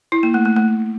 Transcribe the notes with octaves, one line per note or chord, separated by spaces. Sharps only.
E4
A#3
A3
A3
A3